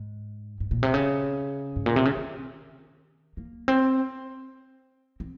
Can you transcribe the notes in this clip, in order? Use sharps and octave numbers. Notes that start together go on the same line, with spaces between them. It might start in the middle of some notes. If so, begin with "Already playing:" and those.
Already playing: G#2
G#2
A#2
C3
C#3
G#2
A#2
C3
C#3
D#3
A#3
C4
C4